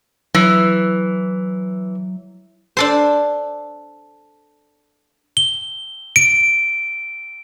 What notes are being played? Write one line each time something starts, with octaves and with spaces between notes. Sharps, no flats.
E3 F#3
D4 A4 C5
G7
D7